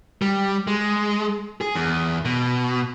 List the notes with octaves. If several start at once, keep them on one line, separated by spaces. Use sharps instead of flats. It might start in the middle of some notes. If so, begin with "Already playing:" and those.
G3
G#3
G#4
E2
B2